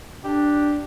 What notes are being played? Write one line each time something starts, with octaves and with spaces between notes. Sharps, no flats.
D4 G4